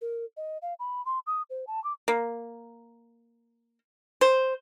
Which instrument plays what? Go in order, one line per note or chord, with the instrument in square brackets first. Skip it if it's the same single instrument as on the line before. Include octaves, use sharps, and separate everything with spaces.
[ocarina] A#4
D#5
F5
B5
C6
D#6
C5
A5
D6
[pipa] A#3
C5